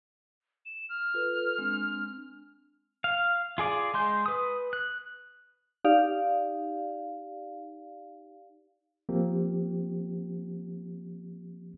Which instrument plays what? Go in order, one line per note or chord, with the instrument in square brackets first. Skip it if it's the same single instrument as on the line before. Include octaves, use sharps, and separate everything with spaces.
[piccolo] E7
F6
[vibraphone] F4 A4 B4
G#3 C4 D4
[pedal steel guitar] F5
F4 G#4 D5 D6
G#3 C6 G6
B4 D#6
F#6
[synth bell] D#4 G4 D5 F5
[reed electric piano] F3 A#3 C4 G4